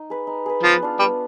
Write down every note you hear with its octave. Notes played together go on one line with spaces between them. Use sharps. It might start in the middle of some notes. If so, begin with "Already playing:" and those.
Already playing: D#4
G#4 B4
D#4
G#4 B4
F3 B3
D4 F4
G3 B3